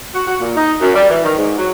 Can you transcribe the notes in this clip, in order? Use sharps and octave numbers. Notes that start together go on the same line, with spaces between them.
F#4
F#4
A#2
D#4
F#2
G3
E3
D#3
G#2
F#3